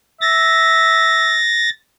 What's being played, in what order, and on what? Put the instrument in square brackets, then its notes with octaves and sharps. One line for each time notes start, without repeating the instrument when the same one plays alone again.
[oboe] E5 [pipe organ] A6 A#6